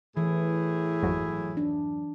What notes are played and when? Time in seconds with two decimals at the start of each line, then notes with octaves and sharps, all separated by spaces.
0.17 A2 E3 E4 G#4
1.03 G#1 F2 F#3
1.57 D4